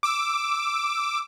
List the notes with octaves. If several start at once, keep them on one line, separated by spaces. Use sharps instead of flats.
D6 E6